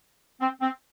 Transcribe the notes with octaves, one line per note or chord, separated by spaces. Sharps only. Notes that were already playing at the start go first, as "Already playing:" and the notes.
C4
C4